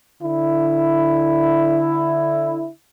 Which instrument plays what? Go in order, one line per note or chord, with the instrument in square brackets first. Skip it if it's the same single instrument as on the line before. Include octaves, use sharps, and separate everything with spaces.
[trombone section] D3 E4